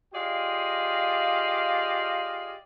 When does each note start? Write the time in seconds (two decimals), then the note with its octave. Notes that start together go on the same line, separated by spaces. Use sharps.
0.14 F4 G4 G#4 D5 D#5 F5